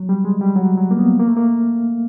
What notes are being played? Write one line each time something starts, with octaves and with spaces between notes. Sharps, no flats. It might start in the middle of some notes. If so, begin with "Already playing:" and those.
Already playing: F#3
G3
G#3
G3
F#3
F#3
A#3
B3
A#3
A3
A#3